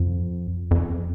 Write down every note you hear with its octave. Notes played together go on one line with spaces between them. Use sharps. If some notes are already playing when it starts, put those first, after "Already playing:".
Already playing: F2
F2